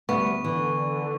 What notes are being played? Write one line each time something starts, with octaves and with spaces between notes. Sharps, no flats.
D2 G3 B3 C#6
D3 E3